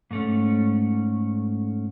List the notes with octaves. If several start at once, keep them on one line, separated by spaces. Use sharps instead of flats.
G#2 A3 C#4